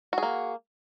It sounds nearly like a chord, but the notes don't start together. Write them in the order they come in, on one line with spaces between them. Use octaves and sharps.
F#4 G#4 A#3